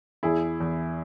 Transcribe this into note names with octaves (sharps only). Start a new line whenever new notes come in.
E2 E4 G#4
E2